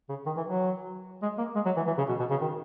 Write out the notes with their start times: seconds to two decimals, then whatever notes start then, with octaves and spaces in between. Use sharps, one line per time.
0.09 C#3
0.26 D#3
0.37 E3
0.47 F#3
1.22 G#3
1.38 A#3
1.55 G#3
1.65 F#3
1.77 E3
1.87 E3
1.98 C#3
2.09 B2
2.19 B2
2.30 C#3
2.41 D#3